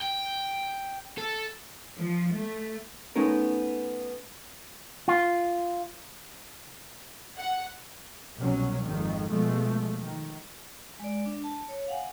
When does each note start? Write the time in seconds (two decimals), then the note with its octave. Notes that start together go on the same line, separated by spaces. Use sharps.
0.01 G5
1.18 A4
1.97 F3
2.33 A3
3.16 A3 B3 C#4 D#4 A#4
5.08 F4
7.37 F#5
8.40 C2 B2 F#3 C#4
8.84 G#1 F2 G#2 D#3
9.27 B2 F3 G#3 A3
10.03 D#3
11.00 G#3 D5
11.26 D4
11.44 A5
11.69 C#5
11.88 F5 F#5 G#5